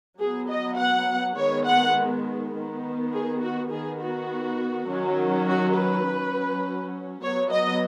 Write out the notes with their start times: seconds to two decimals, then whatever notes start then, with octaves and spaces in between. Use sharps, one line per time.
0.19 F#3 B3 G#4
0.49 D#5
0.77 F#5
1.36 D#3 G#3 B3 C#5
1.66 F#5
2.53 D#3
2.59 B3
3.13 G#4
3.41 F#4
3.70 D#3 B3 G#4
4.00 F#4
4.88 D#3 F#3 C#4
5.47 F#4
5.76 B4
6.05 F#3 C#4
7.21 F#3 B3 C#5
7.51 D#5